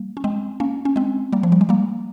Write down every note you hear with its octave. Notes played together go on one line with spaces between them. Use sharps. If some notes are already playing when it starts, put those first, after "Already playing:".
Already playing: G3 A#3
C#4
G#3 C4
A#3 C#4
C#4
G#3 C4
G3 A#3
F3
G3
G#3
G3 A#3